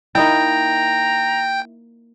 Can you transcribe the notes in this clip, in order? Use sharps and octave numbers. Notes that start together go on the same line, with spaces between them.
A#3 D#4 E4 G5 A#5